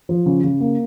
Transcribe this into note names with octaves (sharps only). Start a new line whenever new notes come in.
F3
C#3
C#3
A#3